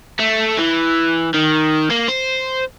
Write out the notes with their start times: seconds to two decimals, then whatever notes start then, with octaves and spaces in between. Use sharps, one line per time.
0.19 A3
0.58 E3
1.34 D#3
1.90 A#3
2.08 C5